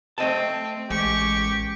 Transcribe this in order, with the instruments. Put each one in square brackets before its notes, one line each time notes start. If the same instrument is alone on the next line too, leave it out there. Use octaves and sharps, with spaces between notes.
[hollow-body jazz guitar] A3 D#5 A5 [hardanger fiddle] C4
[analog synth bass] A1 [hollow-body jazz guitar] G#3 [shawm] G4 [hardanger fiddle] C#6